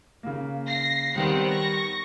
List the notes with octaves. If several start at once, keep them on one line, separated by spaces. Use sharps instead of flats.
C#3 A#3
A#6 C7
D#3 G3 B3 C4 F#5
C#6 A#6